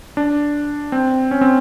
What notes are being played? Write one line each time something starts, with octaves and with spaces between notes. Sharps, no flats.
D4
C4
C#4
C4